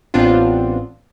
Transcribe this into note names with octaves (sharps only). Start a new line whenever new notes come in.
A1 B3 C4 D4 F4